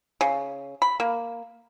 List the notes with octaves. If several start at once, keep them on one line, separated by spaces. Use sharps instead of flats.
C#3
B5
A#3